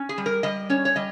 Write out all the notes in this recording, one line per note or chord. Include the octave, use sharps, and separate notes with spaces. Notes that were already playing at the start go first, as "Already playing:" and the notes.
Already playing: C#4
G#4
G3
A#4
G3 D#5
C#4 C#5
C#5
G3 D#5